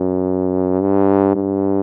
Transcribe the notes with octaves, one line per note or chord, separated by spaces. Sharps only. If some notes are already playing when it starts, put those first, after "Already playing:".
Already playing: F#2
G2
G2